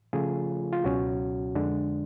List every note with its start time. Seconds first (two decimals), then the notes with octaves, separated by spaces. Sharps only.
0.13 C#3 F3 A3 C#4 F4 G#4
0.73 F4
0.84 C#2 B2 F#3 C#4 F#4
1.55 F2 D3 G#3 D4